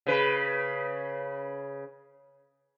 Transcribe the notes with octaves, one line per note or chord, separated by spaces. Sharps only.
C#3 B4